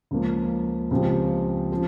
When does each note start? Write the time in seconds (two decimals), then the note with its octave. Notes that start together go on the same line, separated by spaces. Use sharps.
0.11 C#2 C#3 F3 A#3
0.91 C#2 C#3 F3 C4 G4
1.72 F3